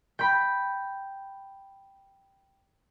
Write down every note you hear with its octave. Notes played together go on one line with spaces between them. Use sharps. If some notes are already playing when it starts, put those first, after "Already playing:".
G5 B5